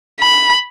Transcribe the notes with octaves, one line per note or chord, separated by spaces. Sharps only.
B5